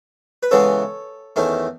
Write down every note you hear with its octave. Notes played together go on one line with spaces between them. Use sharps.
B4
C#3 E3 G#3 B3 A4 C#5
E2 D#3 A3 C#4